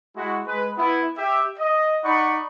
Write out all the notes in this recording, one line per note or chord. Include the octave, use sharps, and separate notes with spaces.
G#3 E4 F#4
G#3 B4
B3 E4
G4 E5
D#5
D#4 D5 F#5 B5 C#6